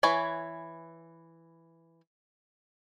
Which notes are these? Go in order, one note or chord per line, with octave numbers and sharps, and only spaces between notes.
E3 B4 C#5 G#5 B5